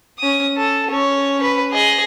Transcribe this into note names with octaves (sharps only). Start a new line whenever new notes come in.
C#4 D#6
A4
C#4 C#5
B4
G#4 D#5